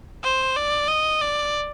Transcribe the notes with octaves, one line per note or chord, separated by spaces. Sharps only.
C5
D5
D#5
D5